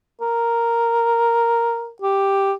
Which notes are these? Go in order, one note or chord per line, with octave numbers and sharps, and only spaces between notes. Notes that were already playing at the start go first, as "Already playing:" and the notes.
A#4
G4